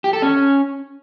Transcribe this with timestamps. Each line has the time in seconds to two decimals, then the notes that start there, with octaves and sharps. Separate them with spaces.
0.04 G4
0.13 A4
0.22 C#4